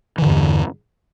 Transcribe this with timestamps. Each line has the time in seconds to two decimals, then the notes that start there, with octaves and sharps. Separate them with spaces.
0.18 E3
0.22 D3
0.26 G2
0.30 E2